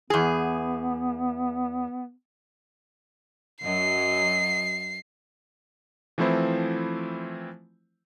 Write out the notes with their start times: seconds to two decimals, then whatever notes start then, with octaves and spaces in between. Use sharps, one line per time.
0.10 E2 B3 G#4
3.62 F#2 F#3 D#5 C7
6.18 E3 F3 A3 C4 E4 C5